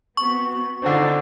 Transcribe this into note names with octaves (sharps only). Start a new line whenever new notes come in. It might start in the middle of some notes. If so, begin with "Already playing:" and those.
B3 C4 F#4 C#6
D3 C4 D4 D#4 F4